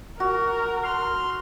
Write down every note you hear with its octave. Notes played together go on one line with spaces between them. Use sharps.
F#4 A#4
C6 F6